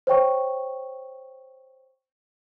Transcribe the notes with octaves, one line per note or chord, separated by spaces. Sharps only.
C5 C#5 G5 C#6